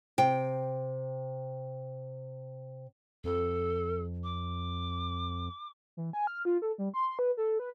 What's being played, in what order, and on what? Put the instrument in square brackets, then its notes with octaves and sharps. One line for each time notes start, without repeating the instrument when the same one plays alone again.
[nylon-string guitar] C3 G5
[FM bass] F2 [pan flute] A4
[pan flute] D6
[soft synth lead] E3
G#5
F6
F4
A4
G3
C6
B4
A4
B4